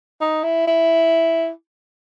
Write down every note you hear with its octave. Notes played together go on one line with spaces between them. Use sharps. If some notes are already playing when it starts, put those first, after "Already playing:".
D#4
E4
E4